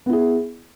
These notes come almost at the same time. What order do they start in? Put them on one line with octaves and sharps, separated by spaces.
B3 E4 G#4